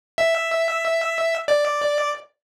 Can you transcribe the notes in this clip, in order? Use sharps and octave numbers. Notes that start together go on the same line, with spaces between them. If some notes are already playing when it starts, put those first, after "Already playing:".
E5
D5